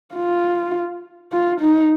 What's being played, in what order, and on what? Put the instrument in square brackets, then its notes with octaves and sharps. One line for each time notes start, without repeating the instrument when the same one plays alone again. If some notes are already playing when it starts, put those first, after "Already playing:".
[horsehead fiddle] F4
F4
D#4